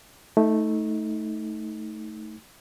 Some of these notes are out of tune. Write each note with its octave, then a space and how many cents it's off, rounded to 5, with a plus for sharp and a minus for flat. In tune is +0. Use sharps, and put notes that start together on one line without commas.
A3 -5 D#4 +20